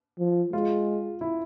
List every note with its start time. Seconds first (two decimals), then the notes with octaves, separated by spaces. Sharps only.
0.19 F3
0.53 G#3 F4
1.21 E4